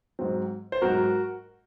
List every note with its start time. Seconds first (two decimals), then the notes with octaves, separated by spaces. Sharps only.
0.19 G#2 F#3 C4
0.72 C5
0.82 G#2 F#3 C4 F#4 A#4